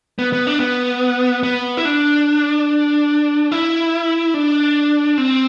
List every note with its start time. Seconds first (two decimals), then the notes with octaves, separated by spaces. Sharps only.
0.19 B3
0.33 B3
0.47 D4
0.60 B3
1.43 B3
1.77 E4
1.85 D4
3.51 E4
4.34 D4
5.18 C4